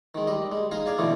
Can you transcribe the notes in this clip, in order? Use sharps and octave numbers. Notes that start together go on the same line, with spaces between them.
D#3 G#3
G3 D#5
G#3
D#4 G#4 D#5 F5
G#4 D5 F5 G#5
B2 D3 E3 A3